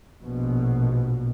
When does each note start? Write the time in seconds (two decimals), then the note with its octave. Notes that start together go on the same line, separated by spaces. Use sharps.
0.24 A#1 B2